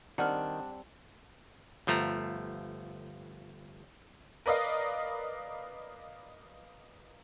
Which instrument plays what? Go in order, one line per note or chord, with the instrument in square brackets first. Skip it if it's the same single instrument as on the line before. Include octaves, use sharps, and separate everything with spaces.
[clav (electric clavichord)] D#3 [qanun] G3 C4 [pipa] D4 [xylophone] F#5 F6
[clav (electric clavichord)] G1 F3 A3 A#5
[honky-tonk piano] A#4 B4 D5 D#5 F5